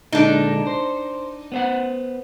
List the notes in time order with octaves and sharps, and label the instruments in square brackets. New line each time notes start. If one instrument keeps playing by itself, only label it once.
[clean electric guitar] A#2 D3 G#3 [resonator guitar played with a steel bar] D4 D#4
[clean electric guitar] C5
B3 C5 F#5